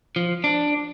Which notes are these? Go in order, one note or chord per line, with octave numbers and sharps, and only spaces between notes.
F3
D4